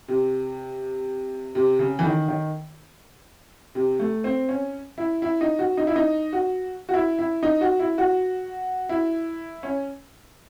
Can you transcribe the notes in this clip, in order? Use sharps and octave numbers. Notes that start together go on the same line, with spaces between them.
C3
C3
C#3
E3
D#3
D#3
C3
A3
C4
C#4
E4
E4
D#4
F#4
D#4
E4
D#4
F#4
F#4
E4
E4
D#4
F#4
E4
F#4
E4
C#4